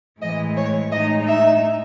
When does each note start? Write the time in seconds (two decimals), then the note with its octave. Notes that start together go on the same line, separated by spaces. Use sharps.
0.21 A2 E3 G#3 D#5
0.56 C#5
0.91 A2 G#3 D#4 D#5
1.27 E5